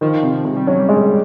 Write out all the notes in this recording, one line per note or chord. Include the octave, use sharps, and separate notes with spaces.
D#3 F3
C3
C3 G#3
G3
F#3 C#4
G3
G#3